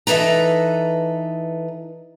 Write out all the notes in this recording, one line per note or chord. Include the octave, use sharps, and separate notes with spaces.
E3 D#4 A4 B4 A#5